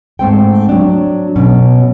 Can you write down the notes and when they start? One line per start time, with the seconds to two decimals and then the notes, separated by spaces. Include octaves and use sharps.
0.19 G#2 A3 C4 G5
0.69 F#3 D4
1.36 B2 F#3 C#4